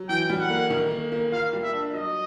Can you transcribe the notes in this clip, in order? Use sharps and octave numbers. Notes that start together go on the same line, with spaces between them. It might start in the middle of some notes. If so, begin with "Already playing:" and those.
Already playing: F#3
E3 G5
G3
F#5
A#3
D#3
A#3
A#3
F4 F5
G3
E5
D4
F#3 D#5